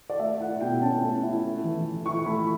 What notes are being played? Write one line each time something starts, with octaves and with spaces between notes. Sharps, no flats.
D5
A3 E5
E4 F#5
B2 G5
C#4 A5
A3
E4
A3
E3
E3
E4 C#6
A3 B5